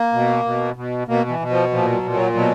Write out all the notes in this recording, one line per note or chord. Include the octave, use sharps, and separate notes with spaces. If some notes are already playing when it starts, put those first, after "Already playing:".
Already playing: A#3
B2
B2
B2
B2 A#3
E3
B2
F3
A#2 F3
F#3
A#2
F#3
B2 F#3